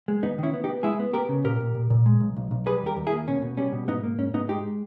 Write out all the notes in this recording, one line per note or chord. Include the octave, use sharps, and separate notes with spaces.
G#3
D#2 B3 D#4
D#3 C#4 E4
B3
D#4 G4
B3
G#3 E4 G#4
B3
B3 G4 A#4
C#3
A#2 G4 A#4
A#2
A#2
A#2
G#3
B1
B1
B1
G3 G#4 B4
D#2 G4 A#4
D#2
E4 G#4
A#3
B2 C#4
B2
G3 C#4
B2
G#2 B3 D#4
A#3
G#2 C#4
G#2 B3 D#4
G#3 D#4 G4